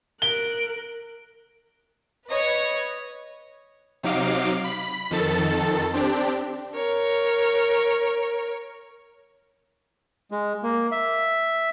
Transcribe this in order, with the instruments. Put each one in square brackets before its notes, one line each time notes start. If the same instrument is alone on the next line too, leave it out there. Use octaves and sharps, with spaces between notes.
[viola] A#4 [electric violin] F#6 D7 [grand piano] G7
[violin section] B4 C#5 D#5
[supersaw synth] C3 F#3 D#4 F5 D6
B5
F2 D#3 A4 A6
C4 D4 G4
[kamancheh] A#4 C#5
[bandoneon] G#3
A#3
E5